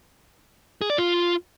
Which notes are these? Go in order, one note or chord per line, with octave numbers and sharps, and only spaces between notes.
G#4
D5
F4